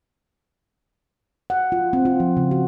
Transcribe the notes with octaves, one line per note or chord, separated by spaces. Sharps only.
F#5
F4
C4
F4
F3
C#3
F#4